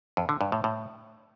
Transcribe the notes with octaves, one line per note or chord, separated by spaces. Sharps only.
F2
D3
G2
A2
A2